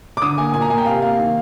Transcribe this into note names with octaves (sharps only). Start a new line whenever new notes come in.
D6
D3 D#6
A#3 G#5
A#2 G#5
A#5
A#3 G#5
G5
C3 F5
A#3 F5
D#3